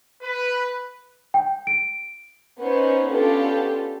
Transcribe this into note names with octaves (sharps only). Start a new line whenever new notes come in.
B4
G5
D7
B3 C#4 D#4 C5
B3 C#4 D4 F4 G4 A4